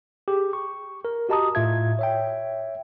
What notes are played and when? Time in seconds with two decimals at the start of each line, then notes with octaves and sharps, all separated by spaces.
0.28 G4 G#4
0.53 C#6
1.05 A#4
1.29 F#4 G4 D#5 A5 A#5 D#6
1.55 A2 F4 E5 G#6
1.99 C#5 E5 G5